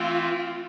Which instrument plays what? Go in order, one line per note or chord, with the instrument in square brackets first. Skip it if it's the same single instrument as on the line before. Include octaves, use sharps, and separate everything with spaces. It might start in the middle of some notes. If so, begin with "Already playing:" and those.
Already playing: [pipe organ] E3 A3 C4 [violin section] F4